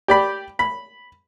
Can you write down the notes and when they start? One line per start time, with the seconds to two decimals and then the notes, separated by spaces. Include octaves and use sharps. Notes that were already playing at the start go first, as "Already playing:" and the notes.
0.08 G4 D5 B5
0.59 B5